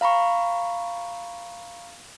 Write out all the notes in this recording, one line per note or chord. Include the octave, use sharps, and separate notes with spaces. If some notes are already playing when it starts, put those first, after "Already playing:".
F5 A#5 B5 C#6